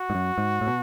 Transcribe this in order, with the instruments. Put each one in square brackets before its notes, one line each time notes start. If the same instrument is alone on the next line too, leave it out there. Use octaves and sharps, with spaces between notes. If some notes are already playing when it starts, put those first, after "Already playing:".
Already playing: [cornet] F#4
[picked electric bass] G#2
F#2
G#2
A2
B2